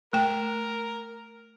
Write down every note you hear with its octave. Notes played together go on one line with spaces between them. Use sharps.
A3 A#4 G5